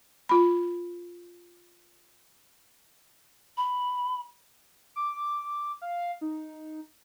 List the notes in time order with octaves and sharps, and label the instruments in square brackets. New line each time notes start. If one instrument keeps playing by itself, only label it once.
[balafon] F4 B5
[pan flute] B5
[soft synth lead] D6
F5
D#4